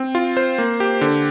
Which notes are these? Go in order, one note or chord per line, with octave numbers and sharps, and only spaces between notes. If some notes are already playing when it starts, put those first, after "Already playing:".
Already playing: C4
F4
C5
A#3
G4
D3